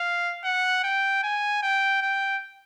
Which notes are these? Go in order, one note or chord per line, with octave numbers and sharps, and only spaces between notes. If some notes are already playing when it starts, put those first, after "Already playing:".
Already playing: F5
F#5
G5
G#5
G5
G5